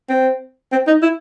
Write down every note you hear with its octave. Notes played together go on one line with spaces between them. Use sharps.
C4
C4
D#4
E4